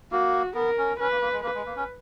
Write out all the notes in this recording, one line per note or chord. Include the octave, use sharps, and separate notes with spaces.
A#3 F#4
B3 A#4
C#4
C#4 B4
A#3
A#3
G#3
A#3 B4
G#3
A#3
C#4